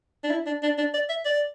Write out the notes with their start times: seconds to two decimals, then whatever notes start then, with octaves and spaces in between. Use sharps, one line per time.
0.24 D4
0.31 E4
0.46 D4
0.63 D4
0.78 D4
0.94 D5
1.09 E5
1.25 D5